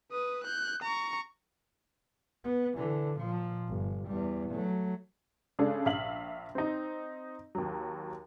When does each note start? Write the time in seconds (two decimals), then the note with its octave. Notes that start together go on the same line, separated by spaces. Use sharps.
0.12 B4 D#6
0.44 F#6 G6
0.83 A#5 C#6
2.44 B3
2.76 D3 E3
3.17 A#2 F3
3.68 G1
4.06 E2 G3
4.51 F#3 A3
5.59 C#3 G#3 D4 A4
5.86 A#1 E5 F5 F#7
6.55 C4 D#4
7.55 D#2 F#3